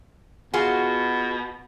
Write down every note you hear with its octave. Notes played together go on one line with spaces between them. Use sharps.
B2 F4 F#4 G#4